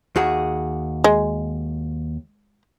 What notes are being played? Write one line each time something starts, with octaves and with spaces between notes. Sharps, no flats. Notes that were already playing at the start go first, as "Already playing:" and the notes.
D#2 F#4 G#4
G#3